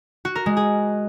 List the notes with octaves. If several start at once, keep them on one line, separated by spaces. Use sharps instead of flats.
F#4
A#4
G#3
G#4